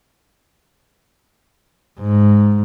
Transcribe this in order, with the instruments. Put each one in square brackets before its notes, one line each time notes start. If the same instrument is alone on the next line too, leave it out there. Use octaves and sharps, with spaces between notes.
[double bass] G#2